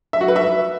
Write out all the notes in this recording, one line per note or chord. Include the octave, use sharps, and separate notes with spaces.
E5
F#4
B4
E5